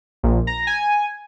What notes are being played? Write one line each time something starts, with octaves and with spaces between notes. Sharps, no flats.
A#1
A#5
G#5